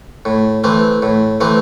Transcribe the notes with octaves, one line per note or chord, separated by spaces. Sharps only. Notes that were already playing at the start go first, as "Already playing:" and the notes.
A2
E3 A3 C4
A2
E3 A3 C4